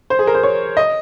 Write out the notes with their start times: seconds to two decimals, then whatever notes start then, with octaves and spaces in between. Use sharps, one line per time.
0.10 C5
0.19 G#4
0.27 A#4
0.34 C5
0.43 C#5
0.77 D#5